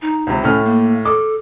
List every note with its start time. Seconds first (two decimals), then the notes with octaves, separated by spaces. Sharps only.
0.02 D#4
0.27 C#2 C3
0.43 A2 A3 C#4 F6
0.65 A#3
1.05 A4 D6